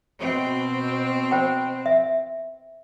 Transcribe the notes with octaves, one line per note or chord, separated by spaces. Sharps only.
B2 C4
C5 G5 B5
E5